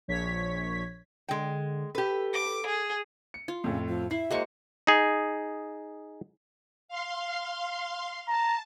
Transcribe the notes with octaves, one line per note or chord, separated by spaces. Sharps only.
A#1 C#5 G#6 B6
D3 G#3 G5
G4 A4 B4
D6
G#4
C#7
F4
F2 A2 C#3
F3
E4 E5 C7
G#3 A#3 F#4 C5 C#6 C#7
D#4 G#4
F5 C6
A5 A#5